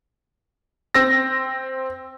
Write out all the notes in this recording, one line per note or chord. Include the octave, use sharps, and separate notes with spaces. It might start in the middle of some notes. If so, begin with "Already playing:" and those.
C4 E6 A#6